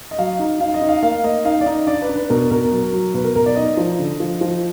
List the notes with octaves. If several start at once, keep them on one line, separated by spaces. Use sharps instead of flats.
D#5
F#3 F5
D#4
D#4 F5
D#5
D#4
F5
A#3 F5
A#3 D#5
D#4 F5
D5
D#4 D#5
D4 D5
B4
D4
B4
B2 A#4
B2 A#4
F#3
F#3
B2 B4
A#4
B2 A#4
D5
D#4 D#5
F3
D3
F3
F3